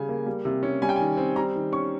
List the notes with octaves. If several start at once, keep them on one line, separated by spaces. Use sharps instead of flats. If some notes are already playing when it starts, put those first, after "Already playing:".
Already playing: C#3 G3 G#5
A#3
G3
C3
C#4
G3 G#5
G5
D#3 G#5
C4
G3 A#5
D#3
C#4 C#6